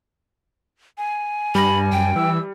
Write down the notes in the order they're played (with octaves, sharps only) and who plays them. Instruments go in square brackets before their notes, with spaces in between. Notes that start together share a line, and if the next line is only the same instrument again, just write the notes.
[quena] G#5
[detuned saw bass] G2 [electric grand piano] G3 A#6 [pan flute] B5
[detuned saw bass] F#2 [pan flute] G5
[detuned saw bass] E3 [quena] E6